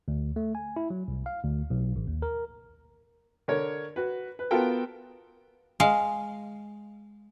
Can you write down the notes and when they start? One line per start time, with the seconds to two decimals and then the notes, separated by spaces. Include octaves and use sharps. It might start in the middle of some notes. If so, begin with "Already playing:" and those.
0.08 D2
0.36 A3
0.55 G#5
0.76 E4
0.90 F#3
1.08 C2
1.26 F5
1.44 D2
1.70 B1
1.96 A1
2.07 D#2
2.22 A#4
3.48 D3 A#4 C#5
3.96 F#4 B4
4.39 B4
4.51 B3 F4 F#4 A4 A#4 G5
5.80 G#3 F5